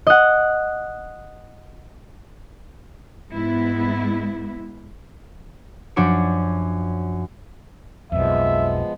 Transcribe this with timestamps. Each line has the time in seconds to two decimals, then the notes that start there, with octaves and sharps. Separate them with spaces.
0.07 D#5 F#5
3.31 G#2 G#3 B3 E4
5.96 F#2 F3 D4 F#4 C#5 D7
8.12 B1 F2 F3 G#3 B3 E5